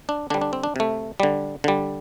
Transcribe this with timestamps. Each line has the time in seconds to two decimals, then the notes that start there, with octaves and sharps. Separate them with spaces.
0.09 D4
0.30 D3 G3 D4
0.41 D4
0.53 C4
0.64 D4
0.76 C3 A3
1.20 D3 G3
1.64 D3 G3